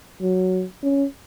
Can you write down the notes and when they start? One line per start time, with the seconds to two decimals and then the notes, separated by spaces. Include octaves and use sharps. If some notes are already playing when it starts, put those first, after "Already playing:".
0.21 F#3
0.83 C#4